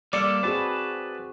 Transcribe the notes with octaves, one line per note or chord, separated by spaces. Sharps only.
G3 A#3 A4 D5
C4 F#4 G#4 B4 A5